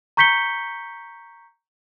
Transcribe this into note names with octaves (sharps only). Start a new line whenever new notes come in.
A#5 C#6 G6 B6 C#7 G7